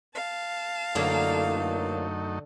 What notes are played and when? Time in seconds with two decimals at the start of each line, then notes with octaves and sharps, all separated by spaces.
0.15 F5 A5
0.95 F#2 D3 E3 F#3 A3 A#3 D#4